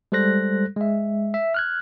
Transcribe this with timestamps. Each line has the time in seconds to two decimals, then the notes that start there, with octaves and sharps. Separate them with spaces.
0.12 G3 G#3 A4 C5 F#6 A#6
0.76 G#3 E5
1.34 E5
1.54 F6 F#6 G#6